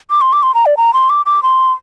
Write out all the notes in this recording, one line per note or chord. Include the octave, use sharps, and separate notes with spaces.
D6
C6
D6
C6
A#5
D5
A#5
C6
D6
D6
C6